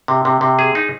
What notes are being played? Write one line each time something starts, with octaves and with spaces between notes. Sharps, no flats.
C3
C3
C3
G#4
D#4